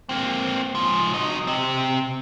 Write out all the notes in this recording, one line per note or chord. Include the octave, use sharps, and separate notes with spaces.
A#3 C4
G#2 F3
F#3 D#5
C3 C4